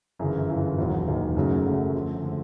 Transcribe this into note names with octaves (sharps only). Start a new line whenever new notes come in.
G1 F#2 C#3 E3
G1 F#2 C#3 E3
E1 D#2 D#3 F#3
E1 D#2 D#3 F#3
F#1 F#2 C#3 F#3 A3
F#1 F#2 C#3 F#3 A3
D3 F3 A3
D3 F3 A3